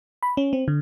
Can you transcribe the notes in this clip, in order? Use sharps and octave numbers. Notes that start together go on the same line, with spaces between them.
B5
C#4
C4
D3